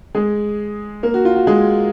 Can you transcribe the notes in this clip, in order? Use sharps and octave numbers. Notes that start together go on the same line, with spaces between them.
G#3 G#4
A#3 A#4
F#4
F4
F#4
G#3 G#4